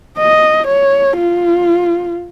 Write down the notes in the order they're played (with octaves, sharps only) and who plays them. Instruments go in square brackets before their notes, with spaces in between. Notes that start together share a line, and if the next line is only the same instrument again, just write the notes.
[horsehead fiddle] D#5
C#5
F4